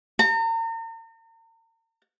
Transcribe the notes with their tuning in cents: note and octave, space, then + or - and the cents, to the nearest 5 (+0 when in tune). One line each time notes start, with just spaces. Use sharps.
A#5 -40